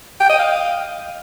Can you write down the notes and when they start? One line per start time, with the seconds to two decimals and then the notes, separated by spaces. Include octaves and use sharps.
0.20 G5
0.30 D#5
0.39 F5